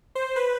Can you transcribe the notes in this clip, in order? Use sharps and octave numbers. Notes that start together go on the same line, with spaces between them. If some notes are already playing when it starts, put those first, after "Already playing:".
C5
B4